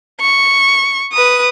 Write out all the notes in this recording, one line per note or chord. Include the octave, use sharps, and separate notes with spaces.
C#6
B4 D#6